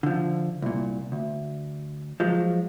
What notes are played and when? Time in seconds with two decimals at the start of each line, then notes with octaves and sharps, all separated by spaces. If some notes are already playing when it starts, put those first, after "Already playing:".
0.03 D3 F3
0.62 C2 A#2
1.12 D2
2.20 F3 F#3 G#3